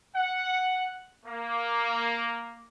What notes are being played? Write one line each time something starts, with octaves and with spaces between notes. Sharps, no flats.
F#5
A#3